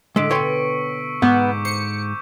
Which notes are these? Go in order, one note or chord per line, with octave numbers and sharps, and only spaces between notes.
A2 D3 G#3 E6 B6 D7
B2 B3 C#5 G5 C6 C#6 C#7
G#2 B3 C#6 D6 G6
C5 C#7